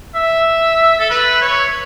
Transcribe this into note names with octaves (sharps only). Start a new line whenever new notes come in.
E5
A4
B4
C#5